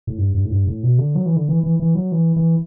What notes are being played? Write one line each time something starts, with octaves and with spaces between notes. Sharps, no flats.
A2
G2
G2
A2
G2
A2
B2
D3
F#3
E3
D3
E3
E3
E3
F#3
E3
E3